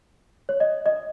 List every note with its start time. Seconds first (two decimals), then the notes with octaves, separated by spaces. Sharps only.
0.49 C#5
0.60 D#5
0.86 D#5